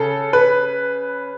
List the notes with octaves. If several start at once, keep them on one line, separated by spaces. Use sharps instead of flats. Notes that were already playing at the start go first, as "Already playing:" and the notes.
Already playing: C#3 A4
B4